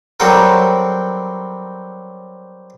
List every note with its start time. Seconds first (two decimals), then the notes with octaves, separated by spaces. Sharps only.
0.20 F#3 G3 C4 F#4 A4 A#4